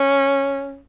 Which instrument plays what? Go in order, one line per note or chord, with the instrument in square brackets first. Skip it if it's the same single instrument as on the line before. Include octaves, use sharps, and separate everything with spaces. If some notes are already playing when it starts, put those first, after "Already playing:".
Already playing: [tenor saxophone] C#4